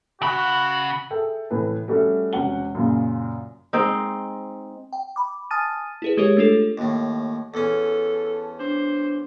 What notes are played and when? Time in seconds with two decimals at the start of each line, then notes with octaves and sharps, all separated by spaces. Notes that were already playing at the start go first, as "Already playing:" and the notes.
0.22 C#3 F#4 B5
1.11 G#4 A4 E5 G5
1.50 A2 C3 E3 B4
1.88 G3 A3 C#4 F#4 A4 E5
2.33 E1 C3 C#4 F#4 F#5 G7
2.75 F#2 A#2 C#3
3.73 G#3 C4 D#4
4.93 G5
5.16 B5 D6
5.51 G#5 A5 D#6 F6 A6 D#7
6.02 E4 G#4 B4
6.17 G#3 G4 G#4 A#4 C#5
6.37 A3 D4 F4 A4
6.78 D#2 A2
7.54 E2 C#4 A4
8.59 D4 C5